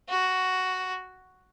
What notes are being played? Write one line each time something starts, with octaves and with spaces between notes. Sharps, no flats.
F#4